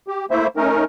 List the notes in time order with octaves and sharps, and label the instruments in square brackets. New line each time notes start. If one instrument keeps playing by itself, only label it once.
[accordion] G4
A3 A#3 E4 C5 E5
A3 C#4 D#4 A#4